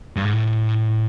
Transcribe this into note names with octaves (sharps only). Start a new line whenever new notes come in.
G2
G#2
A2